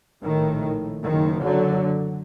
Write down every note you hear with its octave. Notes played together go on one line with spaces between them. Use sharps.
A#1 A2 D#3
F#1 F#2 D#3
D3 F#3